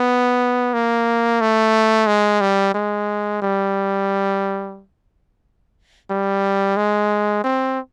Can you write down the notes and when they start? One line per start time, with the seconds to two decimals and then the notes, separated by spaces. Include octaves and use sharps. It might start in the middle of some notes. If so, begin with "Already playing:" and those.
Already playing: B3
0.74 A#3
1.41 A3
2.07 G#3
2.41 G3
2.74 G#3
3.42 G3
6.10 G3
6.77 G#3
7.44 C4